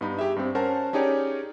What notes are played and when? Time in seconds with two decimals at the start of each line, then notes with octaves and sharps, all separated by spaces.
0.01 G2 B3 D#4 B5
0.19 G4 G#4 E5
0.36 G2 C4
0.55 C#4 A#4 C5 F#5 A5
0.93 C#4 D#4 G4 G#4 C#5 D5